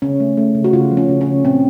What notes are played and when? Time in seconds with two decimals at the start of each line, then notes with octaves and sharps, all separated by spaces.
0.02 C#3 C#4
0.20 A3
0.37 A3
0.55 C#3
0.64 F#4
0.73 C#3 F4
0.91 F3
0.97 C#4
1.09 C#3
1.21 C#4
1.26 C#3
1.44 A#2 C4